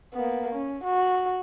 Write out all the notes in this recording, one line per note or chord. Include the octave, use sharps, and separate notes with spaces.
A#3 B3
C#4
F#4